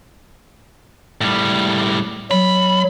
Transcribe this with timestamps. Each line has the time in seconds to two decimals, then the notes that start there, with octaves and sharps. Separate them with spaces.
1.21 A2 G3
2.31 F#3 B5